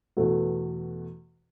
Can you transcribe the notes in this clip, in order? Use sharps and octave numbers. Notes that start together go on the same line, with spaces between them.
E2 B2 A3 F#4 A4